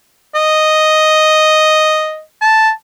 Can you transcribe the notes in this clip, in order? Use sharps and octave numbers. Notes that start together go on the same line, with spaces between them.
D#5
A5